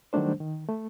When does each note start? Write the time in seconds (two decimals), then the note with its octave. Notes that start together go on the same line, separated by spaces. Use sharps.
0.13 D#3 F#3 G3 A3 D4 C5
0.40 D#3
0.69 A3